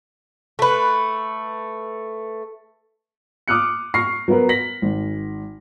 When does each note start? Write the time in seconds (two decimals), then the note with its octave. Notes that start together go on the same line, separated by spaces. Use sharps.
0.59 A3 B4
3.48 D6 D#6 F6 F#6 C#7
3.94 C#6 F6 A#6 C7
4.28 F#3 B3 F#4 A#4 B4
4.49 A#6 B6 F#7
4.82 G#1